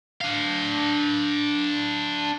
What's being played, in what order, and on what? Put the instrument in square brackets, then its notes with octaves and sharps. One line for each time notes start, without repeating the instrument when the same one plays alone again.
[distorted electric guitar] D4 F5